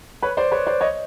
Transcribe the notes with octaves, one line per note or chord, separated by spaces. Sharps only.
B4 C#5
C5 D5
B4 C#5
C5 D5
C#5 D#5